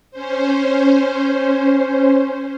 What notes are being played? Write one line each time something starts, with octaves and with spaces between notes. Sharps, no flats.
C#4 C5